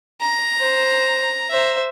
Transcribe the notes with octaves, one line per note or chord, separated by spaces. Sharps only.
A#5
C5
C5 E5